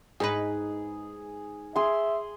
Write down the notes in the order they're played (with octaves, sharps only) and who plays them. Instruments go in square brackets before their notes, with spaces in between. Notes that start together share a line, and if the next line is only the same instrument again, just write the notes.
[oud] G#2 D#4 B4 [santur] G#4
[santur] G#4 C6 [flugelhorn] E5